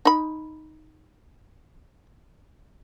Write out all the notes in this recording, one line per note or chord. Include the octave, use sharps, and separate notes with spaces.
D#4 B5